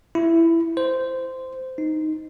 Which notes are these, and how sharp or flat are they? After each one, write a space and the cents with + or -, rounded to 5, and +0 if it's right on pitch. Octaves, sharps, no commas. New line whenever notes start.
E4 +10
C5 -15
D#4 +0